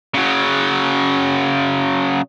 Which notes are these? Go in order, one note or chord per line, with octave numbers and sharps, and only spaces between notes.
C#3 F#3